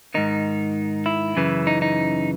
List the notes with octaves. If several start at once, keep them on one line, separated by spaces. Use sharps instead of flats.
G#2 D#3 D#4
E4
F#2 C#3 E3
D#4
D#4